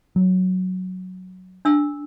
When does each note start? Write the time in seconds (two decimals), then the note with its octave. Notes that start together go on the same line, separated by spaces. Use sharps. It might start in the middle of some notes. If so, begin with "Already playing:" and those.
0.16 F#3
1.65 D4 E6